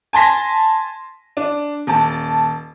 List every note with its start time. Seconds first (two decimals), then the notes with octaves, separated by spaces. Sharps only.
0.13 G#5 A5 C6 A#6 B6
1.37 D4
1.87 D#1 A5